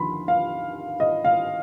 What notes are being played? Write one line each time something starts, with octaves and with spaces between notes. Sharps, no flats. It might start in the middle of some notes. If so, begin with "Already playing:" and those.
Already playing: D#2 D3 F3 B5 C6
F5
D#5
F5